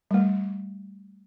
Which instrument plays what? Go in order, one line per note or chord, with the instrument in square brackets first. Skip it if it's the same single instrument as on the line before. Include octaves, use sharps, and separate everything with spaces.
[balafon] G3 A3